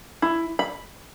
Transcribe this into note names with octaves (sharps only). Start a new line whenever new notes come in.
E4
B5